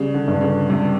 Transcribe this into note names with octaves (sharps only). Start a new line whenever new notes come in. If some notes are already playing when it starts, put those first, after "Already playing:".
Already playing: C#3 G3
D3
G2
D3
C#3
G2 C3